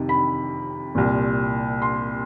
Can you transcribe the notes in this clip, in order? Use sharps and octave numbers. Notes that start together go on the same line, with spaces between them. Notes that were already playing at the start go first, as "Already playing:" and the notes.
Already playing: F2 C3 D#3
B5
C2 A#2
C6